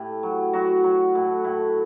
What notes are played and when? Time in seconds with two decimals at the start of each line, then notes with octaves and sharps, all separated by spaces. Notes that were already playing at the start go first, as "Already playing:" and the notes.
Already playing: A2 G4
0.23 F#3
0.53 F#3 F#4
0.84 F#3
1.15 A2
1.45 A2